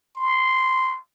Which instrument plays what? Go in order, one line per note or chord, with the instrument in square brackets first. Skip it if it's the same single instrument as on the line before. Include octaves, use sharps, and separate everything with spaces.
[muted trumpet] C6